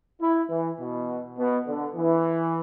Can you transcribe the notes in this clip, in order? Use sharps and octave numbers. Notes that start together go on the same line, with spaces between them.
E4
E3
B2
B2
D3
E3